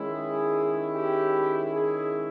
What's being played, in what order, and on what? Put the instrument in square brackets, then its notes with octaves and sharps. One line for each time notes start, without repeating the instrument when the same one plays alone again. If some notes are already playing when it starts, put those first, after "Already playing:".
Already playing: [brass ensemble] D#3 G#3 C#4 E4
G#4
G4
G#4